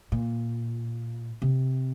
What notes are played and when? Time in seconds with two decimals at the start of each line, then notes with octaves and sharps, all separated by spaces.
0.12 A#2
1.42 C3